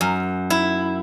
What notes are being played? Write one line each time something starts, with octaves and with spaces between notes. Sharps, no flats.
F#2
E4